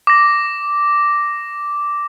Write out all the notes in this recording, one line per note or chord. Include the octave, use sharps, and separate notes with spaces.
D6 A#6